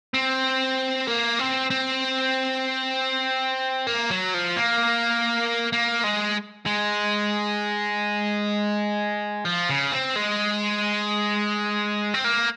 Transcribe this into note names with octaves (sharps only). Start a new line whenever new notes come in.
C4
A#3
C4
C4
A#3
F#3
F3
A#3
A#3
G#3
G#3
F3
C#3
C4
G#3
C4
A#3